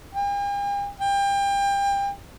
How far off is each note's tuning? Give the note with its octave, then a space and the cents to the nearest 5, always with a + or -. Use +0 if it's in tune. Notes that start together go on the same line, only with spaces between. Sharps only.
G5 +45
G5 +30